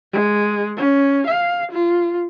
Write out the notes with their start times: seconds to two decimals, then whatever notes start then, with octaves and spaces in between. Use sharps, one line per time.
0.13 G#3
0.77 C#4
1.27 F5
1.72 F4